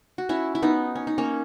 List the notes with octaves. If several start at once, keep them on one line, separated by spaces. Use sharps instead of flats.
F#4
C#4 E4
E4
B3 D#4
C#4
D#4
A#3 C#4